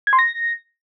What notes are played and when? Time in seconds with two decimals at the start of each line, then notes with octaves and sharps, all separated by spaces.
0.07 G#6
0.13 C6
0.19 A#6